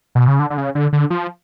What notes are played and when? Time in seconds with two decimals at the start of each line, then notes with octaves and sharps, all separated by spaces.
0.15 B2
0.28 C#3
0.39 D3
0.50 D3
0.58 C#3
0.75 D3
0.93 D3
1.10 F3